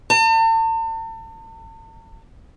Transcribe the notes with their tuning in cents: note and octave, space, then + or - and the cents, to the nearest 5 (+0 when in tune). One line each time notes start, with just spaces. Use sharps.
A5 +40